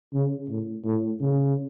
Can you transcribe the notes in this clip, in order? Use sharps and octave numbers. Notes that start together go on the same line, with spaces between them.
C#3
A2
A2
C#3